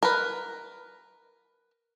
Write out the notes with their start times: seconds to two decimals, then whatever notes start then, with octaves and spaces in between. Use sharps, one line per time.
0.03 A#4 B4